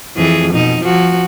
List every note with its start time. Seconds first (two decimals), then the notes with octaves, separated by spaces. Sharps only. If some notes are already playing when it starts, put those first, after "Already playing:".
0.16 F2 E3 G#4
0.53 B2 D#4
0.83 F3 F#4